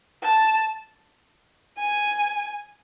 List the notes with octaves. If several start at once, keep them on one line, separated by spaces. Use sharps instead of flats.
A5
G#5